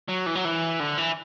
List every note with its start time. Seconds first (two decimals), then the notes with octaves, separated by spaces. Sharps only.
0.08 F#3
0.26 E3
0.35 F#3
0.45 E3
0.80 D3
0.98 E3